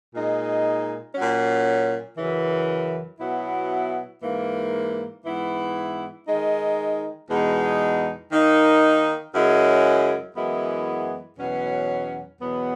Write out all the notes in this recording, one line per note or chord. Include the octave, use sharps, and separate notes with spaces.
A#2 G#3 D#4
A#2 F#3 C#4
F#2 C#3 E3
B2 F#3 B3 E4
G#2 E3 A#3
G#2 E3 B3 E4
D#3 G#3 D#4
E2 B2 G#3 D#4
D#3 A#3 D#4
F#2 C#3 G#3 C#4 E4
F#2 E3 G#3 B3 E4
E2 B2 F#3 C#4
E2 B2 F#3 B3